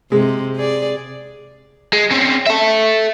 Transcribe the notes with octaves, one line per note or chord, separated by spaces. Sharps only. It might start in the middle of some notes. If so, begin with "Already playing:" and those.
C3 G#3
G#4 D5
G#3
C4 C#4
A4 E5